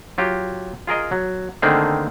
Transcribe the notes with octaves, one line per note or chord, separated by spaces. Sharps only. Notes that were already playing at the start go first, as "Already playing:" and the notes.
F#3 F4 G4
F4 G#4 A#4 D#5
F#3
D3 D#3 A3 A#3 C4 G#4